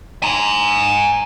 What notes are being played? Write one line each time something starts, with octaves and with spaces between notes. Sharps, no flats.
G#5 A#5